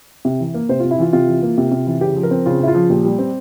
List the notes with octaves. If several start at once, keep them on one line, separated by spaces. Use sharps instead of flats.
C3
E3
A#3
C3 C5
C3 F4
E4
E3 F4
C3 F4
E3
A#3
C3
C3
E3
C#3 G4
F3
A#4
C4
C#3 F4
C#3 E4
F4
F3
A#2 G4
G3
C4